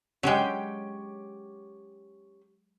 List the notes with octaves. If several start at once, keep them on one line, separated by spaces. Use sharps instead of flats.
F#3 G#3 C#4 G4 G5